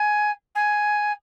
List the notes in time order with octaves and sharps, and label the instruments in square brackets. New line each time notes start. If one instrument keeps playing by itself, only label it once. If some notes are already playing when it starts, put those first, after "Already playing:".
Already playing: [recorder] G#5
G#5